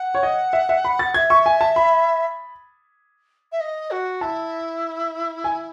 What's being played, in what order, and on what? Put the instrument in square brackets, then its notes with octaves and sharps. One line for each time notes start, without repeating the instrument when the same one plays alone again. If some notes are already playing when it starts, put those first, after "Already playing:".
Already playing: [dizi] F#5
[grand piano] C#5
D#5
E5
E5
B5
A6
[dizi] F#5
[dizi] E5 [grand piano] G#6
[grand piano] C#6
G#5
A5
B5
[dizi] E5
D#5
F#4
[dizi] E4 [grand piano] A5
[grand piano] G#5